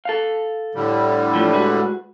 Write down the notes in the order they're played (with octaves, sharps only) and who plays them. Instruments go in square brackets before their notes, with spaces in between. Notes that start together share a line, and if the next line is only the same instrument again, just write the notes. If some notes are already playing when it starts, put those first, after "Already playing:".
[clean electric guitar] A4 F5
[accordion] A2 D3 G3
[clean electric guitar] E3 F3 A3
G#3 F#4 B4